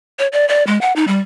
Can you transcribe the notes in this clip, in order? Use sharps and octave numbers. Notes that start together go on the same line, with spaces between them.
C#5
D5
D5
G#3
F#5
D#4
G3